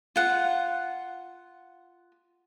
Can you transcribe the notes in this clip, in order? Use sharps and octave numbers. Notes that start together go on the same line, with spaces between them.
F4 F#5